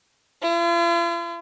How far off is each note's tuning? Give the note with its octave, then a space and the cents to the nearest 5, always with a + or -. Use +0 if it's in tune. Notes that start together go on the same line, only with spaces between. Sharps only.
F4 -45